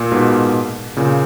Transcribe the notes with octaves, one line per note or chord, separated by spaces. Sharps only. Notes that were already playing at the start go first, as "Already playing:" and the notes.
Already playing: A#2
G#2 B2
A#2 C#3